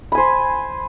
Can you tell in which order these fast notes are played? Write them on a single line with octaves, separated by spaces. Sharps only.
B5 G#5 C5